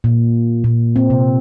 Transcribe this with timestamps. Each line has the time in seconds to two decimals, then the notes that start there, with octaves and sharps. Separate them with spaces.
0.04 A#2
0.64 A#2
0.96 C4
1.10 C3